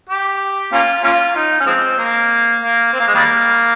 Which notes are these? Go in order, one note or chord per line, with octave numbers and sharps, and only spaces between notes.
G4
A#3 C#4 F4
A#3 C#4 F4
D#4
C#4
F3 G#3 C4
A#3
A#3
C4
A#3
G#3
D#3 G3 A#3